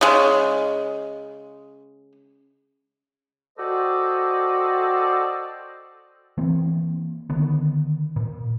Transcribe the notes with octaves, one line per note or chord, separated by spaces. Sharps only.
C#3 G#3
F#4 A4 C5 D5 D#5 G5
E3 A#3 C4
D3 D#3 B3
A#2